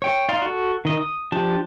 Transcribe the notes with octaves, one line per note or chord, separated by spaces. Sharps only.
C#5 G5
D#4 D5 F5 C6
F#4 A4
D#3 D#5
D#6
F3 D4 G4 A5